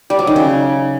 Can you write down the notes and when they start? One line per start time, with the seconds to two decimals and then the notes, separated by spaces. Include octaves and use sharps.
0.10 G3
0.19 F#3
0.27 D#3
0.36 C#3